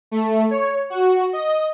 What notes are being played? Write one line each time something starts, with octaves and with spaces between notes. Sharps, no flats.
A3
C#5
F#4
D#5